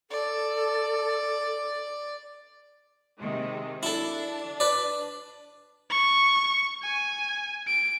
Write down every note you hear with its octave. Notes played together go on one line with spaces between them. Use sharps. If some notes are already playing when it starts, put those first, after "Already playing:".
A4 D5
C3 D#3 G#3
D4 E4 A4
B4 D5
C#6
G#5
D7